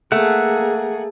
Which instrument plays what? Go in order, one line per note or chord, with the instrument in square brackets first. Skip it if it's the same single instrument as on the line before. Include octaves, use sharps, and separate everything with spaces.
[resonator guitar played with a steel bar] A3 [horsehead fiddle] A#3 G#4 [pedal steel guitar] F#5